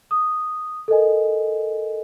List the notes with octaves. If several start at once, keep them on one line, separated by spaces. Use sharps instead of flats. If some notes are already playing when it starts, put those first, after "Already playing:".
D#6
A4 A#4 D#5 G#5